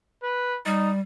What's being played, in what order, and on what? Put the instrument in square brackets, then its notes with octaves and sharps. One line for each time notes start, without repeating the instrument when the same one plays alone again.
[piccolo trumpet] B4
[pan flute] G3 [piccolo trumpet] D#4